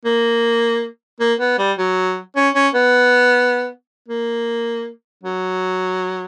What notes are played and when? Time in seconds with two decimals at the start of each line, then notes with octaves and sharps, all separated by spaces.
0.05 A#3
1.20 A#3
1.40 B3
1.58 G3
1.78 F#3
2.36 C#4
2.55 C#4
2.74 B3
4.08 A#3
5.23 F#3